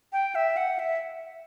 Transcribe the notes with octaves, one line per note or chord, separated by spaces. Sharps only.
G5
E5
F#5
E5